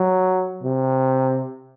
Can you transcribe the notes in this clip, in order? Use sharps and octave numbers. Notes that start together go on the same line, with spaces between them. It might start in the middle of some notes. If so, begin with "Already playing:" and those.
Already playing: F#3
C3